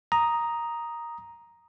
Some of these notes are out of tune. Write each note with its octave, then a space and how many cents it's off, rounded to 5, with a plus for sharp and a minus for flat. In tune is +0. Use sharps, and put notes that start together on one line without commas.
A#5 +5 D#6 +0